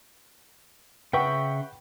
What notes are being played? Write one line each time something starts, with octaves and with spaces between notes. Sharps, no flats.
C#3 B4 E5 F#5 G5 C#6